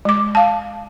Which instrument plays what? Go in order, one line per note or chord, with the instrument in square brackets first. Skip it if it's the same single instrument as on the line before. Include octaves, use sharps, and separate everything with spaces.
[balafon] G#3 D6
F5 A5